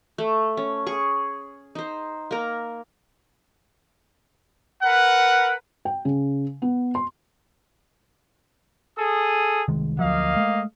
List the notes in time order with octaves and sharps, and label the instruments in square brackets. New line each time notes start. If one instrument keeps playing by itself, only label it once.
[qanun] A3
C#4
G#4 C#6
D#4 C5
A#3 A#4
[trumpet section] A#4 B4 F#5
[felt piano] G5
C#3
B3
C6
[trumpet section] G#4 A4 D#6
[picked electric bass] C2 D#3 G#3
[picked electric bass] D2 F3 F#3 [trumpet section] A#3 D#5 F5
[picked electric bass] G#3 A3